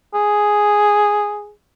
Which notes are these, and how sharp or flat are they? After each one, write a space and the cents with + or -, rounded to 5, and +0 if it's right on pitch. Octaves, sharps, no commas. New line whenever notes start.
G#4 +0